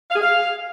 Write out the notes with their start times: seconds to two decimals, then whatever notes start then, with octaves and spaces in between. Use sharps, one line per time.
0.10 F5
0.16 G#4
0.21 F5